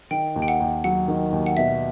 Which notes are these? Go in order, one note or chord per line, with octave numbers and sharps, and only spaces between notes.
D#3 G5
D#2
G5
F#5
D#2
F#3 F#5
D#3
D#2
F#5
B2 E5